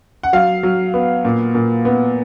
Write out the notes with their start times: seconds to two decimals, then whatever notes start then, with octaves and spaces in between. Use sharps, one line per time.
0.23 F#5
0.33 F#3 F5
0.63 F#3
0.94 B3
1.25 A#2
1.55 A#2
1.85 B3